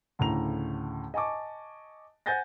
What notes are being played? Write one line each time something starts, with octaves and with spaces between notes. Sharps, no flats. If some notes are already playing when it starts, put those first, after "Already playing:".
D2 A2 C#3 A#5 F7
D#5 G#5 A5 C#6 D6
C5 F#5 G#5 G6 A6 A#6